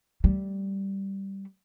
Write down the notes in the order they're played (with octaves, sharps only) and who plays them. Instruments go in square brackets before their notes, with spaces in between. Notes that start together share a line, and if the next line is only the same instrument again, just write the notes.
[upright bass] G3 A3